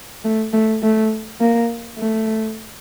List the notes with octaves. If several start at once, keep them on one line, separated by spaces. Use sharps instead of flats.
A3
A3
A3
A#3
A3